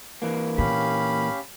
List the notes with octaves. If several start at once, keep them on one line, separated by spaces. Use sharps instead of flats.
E3 A#3 B4
A#2 C#4 G4 F5 B5